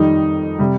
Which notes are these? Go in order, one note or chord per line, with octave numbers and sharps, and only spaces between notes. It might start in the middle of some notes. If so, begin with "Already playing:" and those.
Already playing: F2 D#3 G3 D#4
C3 G3